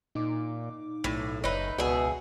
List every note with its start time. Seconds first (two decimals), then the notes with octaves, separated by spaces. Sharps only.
0.15 A#2 D#4 D6
1.04 B1 A2
1.44 F#1 D#4 B4 C#5 E5
1.78 C#2 B2 G#4 E5 F#5 E6